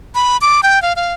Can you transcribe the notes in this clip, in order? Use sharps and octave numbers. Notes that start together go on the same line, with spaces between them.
B5
D6
G5
F5
F5